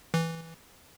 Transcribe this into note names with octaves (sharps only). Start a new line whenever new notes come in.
E3